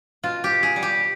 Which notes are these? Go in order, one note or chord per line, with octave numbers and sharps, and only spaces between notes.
B2 F4
G4
B2
G#4
G3
G4